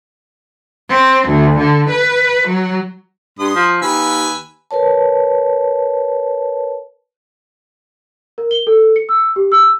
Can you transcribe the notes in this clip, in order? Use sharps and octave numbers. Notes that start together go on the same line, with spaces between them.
C4
D2
D3
B4
F#3
G2 C6 D#6
F3
D#2 B4 G#5 E6
A#4 B4 C#5 A5
A#4
G7
A4
C#7
E6
G4
E6